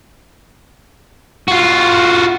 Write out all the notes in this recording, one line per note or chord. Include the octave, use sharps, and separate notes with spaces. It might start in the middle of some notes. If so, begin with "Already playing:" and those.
F4 F#4